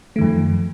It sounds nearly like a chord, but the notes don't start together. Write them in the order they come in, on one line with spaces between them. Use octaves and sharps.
A3 D#3 F#2 F3